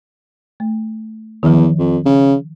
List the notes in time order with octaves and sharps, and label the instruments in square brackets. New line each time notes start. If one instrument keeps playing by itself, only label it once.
[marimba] A3
[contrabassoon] E2 [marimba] D#3 F3
[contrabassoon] F2
C#3